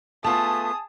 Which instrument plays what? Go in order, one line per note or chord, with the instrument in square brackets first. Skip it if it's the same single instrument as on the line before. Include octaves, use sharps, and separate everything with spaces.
[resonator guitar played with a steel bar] A3 B3 F4 [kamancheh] G#4 D#6 [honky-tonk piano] A5